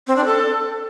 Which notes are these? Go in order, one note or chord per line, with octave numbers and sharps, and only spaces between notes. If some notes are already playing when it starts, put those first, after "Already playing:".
C4
D4
A4